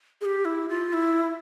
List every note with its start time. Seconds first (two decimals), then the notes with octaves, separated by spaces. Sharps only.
0.21 G#4
0.25 G4
0.45 E4
0.69 F4
0.93 E4